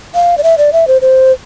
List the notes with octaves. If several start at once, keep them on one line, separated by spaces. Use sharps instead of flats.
F5
D5
E5
D5
E5
C5
C5